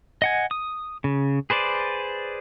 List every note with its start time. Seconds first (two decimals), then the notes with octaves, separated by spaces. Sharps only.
0.22 D#5 F#5 G#5
0.51 D#6
1.04 C#3
1.50 G#4 B4 C5 D5